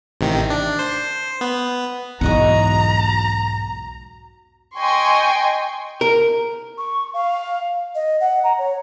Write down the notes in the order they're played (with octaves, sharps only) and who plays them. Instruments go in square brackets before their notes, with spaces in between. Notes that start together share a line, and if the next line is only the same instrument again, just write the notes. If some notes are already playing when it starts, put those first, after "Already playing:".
[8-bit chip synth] A1 C3 D#3
D4
C5
B3
[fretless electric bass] B1 E2 [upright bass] G#2 [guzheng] F#4 D#5 F#5 [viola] A#5
[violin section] D#5 G5 G#5 C6 C#6
[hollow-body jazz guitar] A#4
[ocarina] C#6
F5
D#5
F#5
A#5
C#5